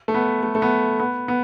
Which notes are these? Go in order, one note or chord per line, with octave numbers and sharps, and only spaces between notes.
A3
B3
A3
A3
B3
B3
B3